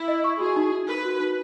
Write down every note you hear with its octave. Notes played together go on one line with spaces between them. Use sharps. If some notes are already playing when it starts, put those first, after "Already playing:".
Already playing: E4
D#5
C#6
F#4 G#4
D#4
D#4
A#4 B4
F#4
D#4